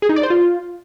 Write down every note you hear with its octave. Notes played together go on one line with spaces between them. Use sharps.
G#4
D#4
D5
C5
F4